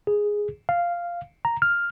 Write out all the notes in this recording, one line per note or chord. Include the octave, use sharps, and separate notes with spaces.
G#4
F5
A#5
F6